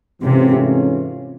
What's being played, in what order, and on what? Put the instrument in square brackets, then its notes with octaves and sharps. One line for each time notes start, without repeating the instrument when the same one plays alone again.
[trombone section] G#2 E3 A3 C#4 F4 [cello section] C3